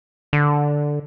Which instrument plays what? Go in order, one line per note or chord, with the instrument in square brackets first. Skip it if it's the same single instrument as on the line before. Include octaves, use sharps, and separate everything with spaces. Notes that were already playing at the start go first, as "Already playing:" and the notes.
[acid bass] D3